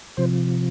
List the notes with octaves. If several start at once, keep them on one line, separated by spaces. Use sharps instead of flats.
C3 F3 C5